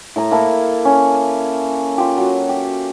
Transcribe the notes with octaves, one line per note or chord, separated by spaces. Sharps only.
A2 A#5
A#3 E4 A4
C#4
F4 G4
F#3
G4